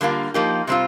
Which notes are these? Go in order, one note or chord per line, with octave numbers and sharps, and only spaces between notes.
D3 G3 A#3 F4
F3 A#3 D#4 G4
C3 G3 C4 F4